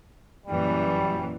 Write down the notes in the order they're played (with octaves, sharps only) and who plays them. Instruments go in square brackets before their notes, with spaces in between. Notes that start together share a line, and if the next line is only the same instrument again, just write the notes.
[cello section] F#2 A#2 E3 [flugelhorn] G3